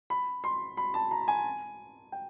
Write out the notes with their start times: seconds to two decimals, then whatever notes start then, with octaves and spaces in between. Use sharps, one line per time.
0.10 B5
0.44 C6
0.77 B5
0.94 A5
1.11 A#5
1.28 G#5
2.12 G5